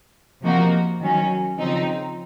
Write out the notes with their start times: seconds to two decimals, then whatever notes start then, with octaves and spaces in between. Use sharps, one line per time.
0.42 C3 F3 A#3 D#4 F#4
1.00 D#3 F#3 C#4
1.58 C#3 F3 C4 D#4